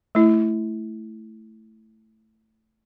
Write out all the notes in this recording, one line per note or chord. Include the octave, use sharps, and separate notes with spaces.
A3 E4